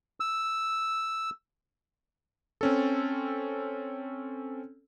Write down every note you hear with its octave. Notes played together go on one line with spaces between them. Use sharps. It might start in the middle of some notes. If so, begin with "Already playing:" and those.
E6
C4 C#4 A4